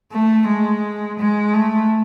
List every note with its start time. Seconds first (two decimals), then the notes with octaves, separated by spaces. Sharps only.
0.12 A3
0.48 G#3
1.19 G#3
1.54 A3